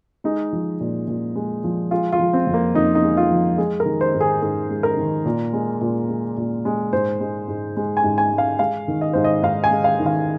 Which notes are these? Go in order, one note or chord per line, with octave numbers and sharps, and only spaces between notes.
G#3 D#4
F3
A#2
A#2
G#3
F3
G#3 F4
F4
F3
C4
F2
A#3
F2 D#4
D#4
G#3
F4
F3
G#3 G#4
A#4
D#3
C5
G#2
G#4
G#2 G#4
G#3
A#4
D#3
A#2
G#3
A#2
G#3
A#2
G#3
G#2 C5
G#3
G#2
G#3
G#5
G#2
G#5
G#3
F5
G#3 F5
D#3
D#5
G#2 C5
D#5
G#2 F5
G#5
G#3
F5
D#3
F5